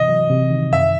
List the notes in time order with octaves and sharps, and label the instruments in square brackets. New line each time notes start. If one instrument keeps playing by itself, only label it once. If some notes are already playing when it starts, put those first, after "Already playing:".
Already playing: [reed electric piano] C3 E3 [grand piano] D#5
[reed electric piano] F#3
C3
D#3
[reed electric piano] F#2 [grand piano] E5